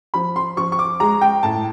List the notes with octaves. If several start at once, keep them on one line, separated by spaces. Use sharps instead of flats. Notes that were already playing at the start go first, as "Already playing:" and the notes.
F3 B5
C6
F3 C#6
C#6
D6
G#3 A#5
G5
A2 A5